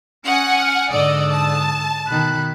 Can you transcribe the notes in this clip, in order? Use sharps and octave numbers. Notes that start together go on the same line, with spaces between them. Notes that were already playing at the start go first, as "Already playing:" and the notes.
C#4 D#5 F#5 G#5
F6
G#2 D3 D5 D#5 D#6 E6
A5
B2 D#3 B5 F#6